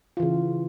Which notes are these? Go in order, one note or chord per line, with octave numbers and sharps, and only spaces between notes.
C#3 E3 F4